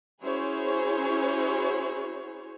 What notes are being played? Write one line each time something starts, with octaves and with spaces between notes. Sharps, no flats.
C#4 E4 F#4 G#4 C5 C#5